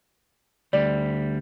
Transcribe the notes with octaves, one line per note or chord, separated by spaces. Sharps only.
D2 G3 D5